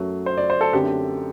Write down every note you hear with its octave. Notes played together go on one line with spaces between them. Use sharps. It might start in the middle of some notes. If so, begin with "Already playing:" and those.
Already playing: F#2 F#3 A3
C5
D5
C5
A4
F#2 D3 A3 C4 G4